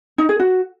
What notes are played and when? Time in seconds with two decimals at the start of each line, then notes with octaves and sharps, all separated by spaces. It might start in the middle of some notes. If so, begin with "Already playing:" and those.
0.18 D#4
0.29 G#4
0.40 F#4